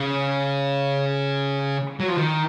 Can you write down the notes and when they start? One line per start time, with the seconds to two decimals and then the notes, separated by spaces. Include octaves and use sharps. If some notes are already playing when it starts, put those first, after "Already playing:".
Already playing: C#3
2.00 F#3
2.08 F3
2.18 D#3